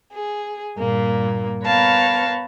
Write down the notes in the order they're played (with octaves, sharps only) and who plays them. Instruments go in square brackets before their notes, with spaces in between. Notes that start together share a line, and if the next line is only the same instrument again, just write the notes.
[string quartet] G#4
G2 A#2 A#3
B3 A#4 B4 C#5 F5 A5